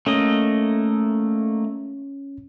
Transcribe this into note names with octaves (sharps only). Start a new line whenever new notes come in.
A3 A#3 C#4 D#5